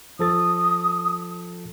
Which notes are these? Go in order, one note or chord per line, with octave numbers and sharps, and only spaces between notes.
F3 A4 D#6 A6